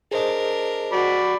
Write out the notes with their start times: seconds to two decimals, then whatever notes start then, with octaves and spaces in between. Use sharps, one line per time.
0.11 D4 G#4 A#4 C5 D#5
0.92 F#4 D5 B5